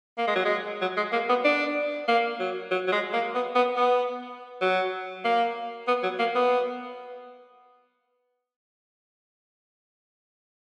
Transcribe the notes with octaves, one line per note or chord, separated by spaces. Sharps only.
A#3
G#3
F#3
G#3
F#3
G#3
A#3
B3
D4
A#3
F#3
F#3
F#3
G#3
A#3
B3
B3
B3
F#3
A#3
B3
F#3
A#3
B3